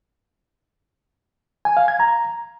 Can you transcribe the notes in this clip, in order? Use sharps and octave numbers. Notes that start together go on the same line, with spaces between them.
G#5
F5
G#6
A#5